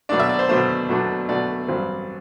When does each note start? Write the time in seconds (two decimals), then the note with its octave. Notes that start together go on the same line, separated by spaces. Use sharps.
0.09 B2 F#3 A3 D4 D5
0.19 E5
0.29 D5
0.39 C5
0.49 B2 F#3 A3 D4 C5
0.89 B2 F#3 A3 D4
1.29 B2 F#3 A3 D4 D5
1.68 A1 G2 F#3 C4